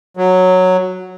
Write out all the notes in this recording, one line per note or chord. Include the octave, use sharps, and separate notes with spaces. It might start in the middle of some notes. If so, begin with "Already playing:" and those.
F#3